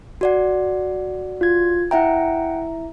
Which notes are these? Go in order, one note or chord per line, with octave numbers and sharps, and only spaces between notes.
F#4 D5 F#5
F4 G#6
E4 E5 F#5 G5 A#5